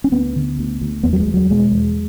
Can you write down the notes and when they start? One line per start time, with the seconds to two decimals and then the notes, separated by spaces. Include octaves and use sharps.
0.04 C#4
0.12 D2 B3
0.36 D3
0.59 D2
0.81 D2
1.03 E2 B3
1.13 F#3
1.20 G#3
1.27 E2
1.34 F#3
1.50 B2 G#3
1.73 E2